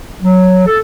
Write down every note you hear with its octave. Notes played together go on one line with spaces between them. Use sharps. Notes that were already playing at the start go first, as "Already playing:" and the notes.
F#3
A4